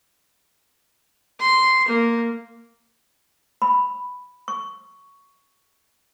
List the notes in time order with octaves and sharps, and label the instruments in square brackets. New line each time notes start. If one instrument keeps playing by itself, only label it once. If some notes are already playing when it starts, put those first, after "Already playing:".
[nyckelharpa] C6
A#3
[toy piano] B5
C#6